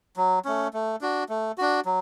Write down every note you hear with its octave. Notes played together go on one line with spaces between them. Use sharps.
F#3
A3 C#4
A3
D4 F#4
A3
D4 F#4
F#3